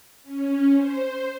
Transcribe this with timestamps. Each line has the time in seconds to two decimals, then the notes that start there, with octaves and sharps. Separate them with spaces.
0.23 C#4
0.74 C5